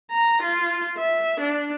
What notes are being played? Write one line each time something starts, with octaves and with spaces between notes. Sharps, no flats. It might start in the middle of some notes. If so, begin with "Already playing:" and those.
A#5
F4
E5
D4